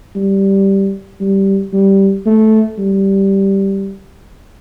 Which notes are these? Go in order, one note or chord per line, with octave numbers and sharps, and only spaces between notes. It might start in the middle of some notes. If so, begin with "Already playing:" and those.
G3
G3
G3
A3
G3